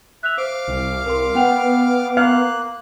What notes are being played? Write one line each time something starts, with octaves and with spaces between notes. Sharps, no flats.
E5 F#6 F7
C5 F5 D6 F6
C2
C2 A#4 C6
B3 F#5 G5 F7
A#3 F5 F#6